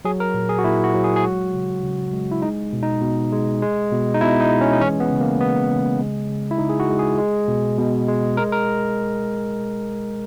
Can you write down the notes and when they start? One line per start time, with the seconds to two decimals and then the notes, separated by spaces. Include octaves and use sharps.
0.05 F#3 G#4
0.20 A#4
0.34 A#2
0.49 G#4
0.58 F#4
0.64 A#2 E4
0.84 F#4
0.94 F#3
1.04 G#4
1.16 G#4
1.24 G#3 F#4
1.53 C#3
1.83 C#3
2.13 G#3
2.32 E4
2.42 G#3 D#4
2.73 B2
2.83 D#4
3.02 B2
3.32 G#3
3.62 G#3
3.92 B2
4.14 D#4
4.21 B2 E4
4.40 D#4
4.51 G#3
4.61 C#4
4.73 D#4
4.80 E3 C#4
5.00 B3
5.10 C#3
5.21 A#3
5.40 G#3 B3
5.70 C#3
6.00 G#3
6.30 C#3
6.51 E4
6.59 C#3 D#4
6.69 G#4
6.80 F#4
6.89 G#3
6.99 G#4
7.18 G#3
7.48 B2
7.78 B2
8.08 G#3
8.37 G#3 A#4
8.52 A#4